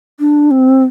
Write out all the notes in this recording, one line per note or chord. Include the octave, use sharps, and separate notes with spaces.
D4
C4